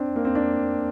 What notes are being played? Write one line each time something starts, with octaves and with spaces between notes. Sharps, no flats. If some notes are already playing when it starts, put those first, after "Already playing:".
Already playing: C4 D4
A#3
C4
D4